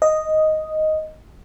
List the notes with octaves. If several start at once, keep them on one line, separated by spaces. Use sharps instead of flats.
D#5